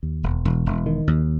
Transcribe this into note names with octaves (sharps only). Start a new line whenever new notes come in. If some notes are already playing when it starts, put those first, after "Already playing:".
D#2
E1
E1
E1
D#3
D#2